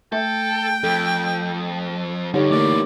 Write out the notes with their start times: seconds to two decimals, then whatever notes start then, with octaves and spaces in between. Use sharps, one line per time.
0.12 A3 A4 G5
0.84 F2 A4
2.34 G2 D3 D#4 G4 C#5
2.51 E3 A3 A#3 C#5 D5